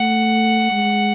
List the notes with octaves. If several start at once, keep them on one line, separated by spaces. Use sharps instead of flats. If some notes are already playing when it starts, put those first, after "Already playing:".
Already playing: A3 F#5
G#3